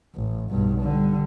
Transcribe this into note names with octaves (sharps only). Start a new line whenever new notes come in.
A1
B1 G2
D3 G3